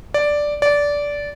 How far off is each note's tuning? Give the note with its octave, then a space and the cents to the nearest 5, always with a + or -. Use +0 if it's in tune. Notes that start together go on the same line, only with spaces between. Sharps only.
D5 +0
D5 -15